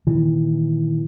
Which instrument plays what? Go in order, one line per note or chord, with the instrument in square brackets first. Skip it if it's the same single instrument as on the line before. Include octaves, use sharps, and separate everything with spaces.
[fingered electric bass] A#2 D#3 E3